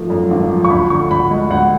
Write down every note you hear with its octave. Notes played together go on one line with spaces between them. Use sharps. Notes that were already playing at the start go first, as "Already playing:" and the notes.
Already playing: G#1 F3 A3
F#2
G#1
F3
C#6
D2 B5
D3 C#6
D2 B5
G#3
D2 F#5